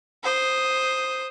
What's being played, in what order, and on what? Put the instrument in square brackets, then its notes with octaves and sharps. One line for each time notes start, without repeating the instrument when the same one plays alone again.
[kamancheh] C5 D#6